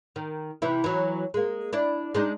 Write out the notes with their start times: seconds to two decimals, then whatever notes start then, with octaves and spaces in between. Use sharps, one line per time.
0.16 D#3
0.62 C3 E3 E4
0.84 E3 F#3
1.34 G#3 A#3
1.73 D4 E4 D5
2.14 G#3 D4 D#4